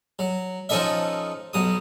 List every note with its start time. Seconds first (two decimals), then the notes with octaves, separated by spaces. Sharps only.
0.19 F#3
0.69 F3 C#4 D#4 A4 D#5 E5
1.53 B1 F#3 D#6